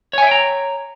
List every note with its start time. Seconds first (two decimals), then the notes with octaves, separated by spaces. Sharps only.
0.13 C#5
0.18 G#5
0.22 E5
0.27 G5
0.31 A#5